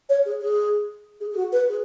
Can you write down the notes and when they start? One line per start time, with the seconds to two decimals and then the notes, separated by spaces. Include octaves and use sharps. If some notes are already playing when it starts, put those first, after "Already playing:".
0.09 C#5
0.26 G#4
0.41 G#4
1.21 G#4
1.32 G#4
1.37 F#4
1.52 B4
1.69 G#4